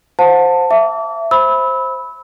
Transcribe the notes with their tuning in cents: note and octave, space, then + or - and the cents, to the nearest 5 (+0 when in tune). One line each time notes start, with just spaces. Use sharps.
C5 +0 F#5 -45 A5 +15
E5 +15 D6 -35
C5 +10 B5 +0 E6 -25